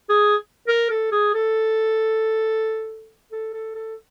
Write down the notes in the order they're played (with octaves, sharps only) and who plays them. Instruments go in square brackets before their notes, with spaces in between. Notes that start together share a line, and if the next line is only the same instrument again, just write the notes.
[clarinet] G#4
A#4
A4
G#4
A4
A4
A4
A4